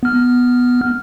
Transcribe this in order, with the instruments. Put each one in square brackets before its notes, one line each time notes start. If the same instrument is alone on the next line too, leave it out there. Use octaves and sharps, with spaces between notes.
[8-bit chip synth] B3 F6